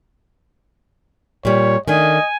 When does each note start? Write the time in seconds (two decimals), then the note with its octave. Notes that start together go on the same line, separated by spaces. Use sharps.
1.45 A#2 G3 C#5
1.88 D#3 A3 D4 D#5 G#5